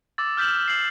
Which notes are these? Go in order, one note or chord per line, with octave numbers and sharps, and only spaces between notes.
D6 E6 A6
F6 G6 B6 E7 F#7
F6 C7 F#7